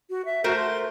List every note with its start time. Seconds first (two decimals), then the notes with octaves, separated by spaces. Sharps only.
0.10 F#4
0.25 E5
0.44 A3 F#4 A#4 C5
0.56 C6